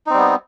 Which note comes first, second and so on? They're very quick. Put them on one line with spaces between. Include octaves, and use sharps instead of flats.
D#4 C4 G3 B3